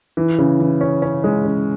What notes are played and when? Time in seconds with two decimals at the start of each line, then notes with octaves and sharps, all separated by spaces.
0.17 E3
0.39 C#3
0.60 E3
0.81 C#4
1.02 C#4
1.24 G#3
1.45 C#3